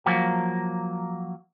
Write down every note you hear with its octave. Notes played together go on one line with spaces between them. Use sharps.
F3 F#3 A#3